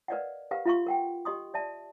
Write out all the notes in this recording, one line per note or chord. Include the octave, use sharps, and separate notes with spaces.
A#4 B4 D5 D#5 F5 F#5
G4 A#4 B4 F5 F#5
F4 E5 F5 C6 C#6
A#4 F#5 G5
G4 D#5 C6 D#6
D5 E5 A5